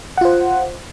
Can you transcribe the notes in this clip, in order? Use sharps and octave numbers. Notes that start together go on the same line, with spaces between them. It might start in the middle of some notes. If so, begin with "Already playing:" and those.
F4 C5 F#5